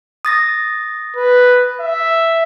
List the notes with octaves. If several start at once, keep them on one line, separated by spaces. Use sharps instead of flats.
D#6 A6 A#6
B4
E5